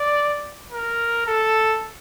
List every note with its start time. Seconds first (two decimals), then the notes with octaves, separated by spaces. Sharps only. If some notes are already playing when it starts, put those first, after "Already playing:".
Already playing: D5
0.73 A#4
1.27 A4